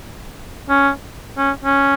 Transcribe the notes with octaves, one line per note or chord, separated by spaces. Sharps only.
C#4
C#4
C#4